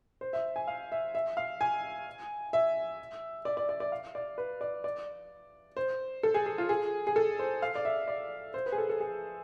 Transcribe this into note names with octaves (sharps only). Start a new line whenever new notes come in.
C5
E5
G#5
F5
E5
E5
F5
G#5
E5
D5
D5
D5
D5
F5
D5
B4
D5
D5
C5
A4
G#4
G#4
F4
G#4
G#4
A4
C5
F5
D5
E5
D5
C5
B4
G#4
A4
A4
G#4